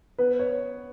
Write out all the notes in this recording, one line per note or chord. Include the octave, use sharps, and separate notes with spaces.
B3 B4
C#5